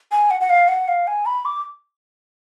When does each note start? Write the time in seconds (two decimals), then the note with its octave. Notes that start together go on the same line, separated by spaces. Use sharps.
0.12 G#5
0.31 F#5
0.41 F#5
0.50 F5
0.68 F#5
0.88 F5
1.07 G#5
1.26 B5
1.45 D6